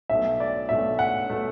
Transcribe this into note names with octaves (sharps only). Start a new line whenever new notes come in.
B1 B2 A3 E5
D5
B1 B2 A3 E5
F#5
B2 A3